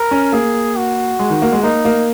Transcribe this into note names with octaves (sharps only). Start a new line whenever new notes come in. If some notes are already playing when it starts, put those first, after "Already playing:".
Already playing: A#4
C#4
A#3 G#4
F#4
G#3
D#3
A#3
G#3
A#3 D#4
A#3